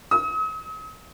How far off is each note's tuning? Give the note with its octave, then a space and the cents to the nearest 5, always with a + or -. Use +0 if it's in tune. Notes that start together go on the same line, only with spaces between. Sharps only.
D#6 +45